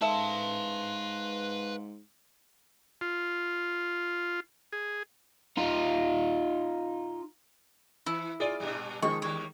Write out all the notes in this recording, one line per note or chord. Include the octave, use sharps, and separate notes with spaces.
G#2 A4 B4 E5 F5 A5 C6
F4
G#4
D#4 F4
E3 E4
F4 G#4 D5
G2 A#2 G3
D#3 F3 G#3 C#6
D#2 G3 C#5